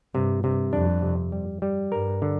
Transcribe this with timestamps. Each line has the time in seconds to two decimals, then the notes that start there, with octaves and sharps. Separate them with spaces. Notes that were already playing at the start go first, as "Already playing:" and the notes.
0.14 G2 C3
0.43 G2 C3
0.73 F2 D4
1.02 C3
1.32 G3
1.62 G3
1.92 G2 A#4
2.22 D3